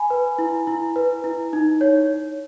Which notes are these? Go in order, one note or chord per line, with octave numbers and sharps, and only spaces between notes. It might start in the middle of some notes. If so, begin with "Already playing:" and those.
Already playing: G#5 B5
B4
E4
E4
B4
E4
D#4
C#5